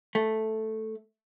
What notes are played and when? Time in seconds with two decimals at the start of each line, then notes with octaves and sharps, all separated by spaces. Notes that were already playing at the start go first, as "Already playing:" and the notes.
0.15 A3